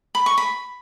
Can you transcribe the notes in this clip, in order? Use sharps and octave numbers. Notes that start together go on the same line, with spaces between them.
B5
C#6
B5